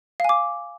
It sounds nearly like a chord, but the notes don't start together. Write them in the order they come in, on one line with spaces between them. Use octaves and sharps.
F5 G#5 D6